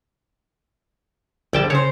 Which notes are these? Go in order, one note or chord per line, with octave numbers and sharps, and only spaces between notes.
A#1 D3 G3 G5 A5
C#3 C5 C#5